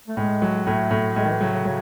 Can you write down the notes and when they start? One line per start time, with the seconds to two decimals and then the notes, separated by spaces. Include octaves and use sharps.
0.08 A3
0.17 A2 G#3
0.42 F#3
0.66 A2 A3
0.91 A2
1.15 A2 G#3
1.24 D#3
1.27 E3
1.41 C#3 F#3
1.53 C#3
1.65 C#3 F#3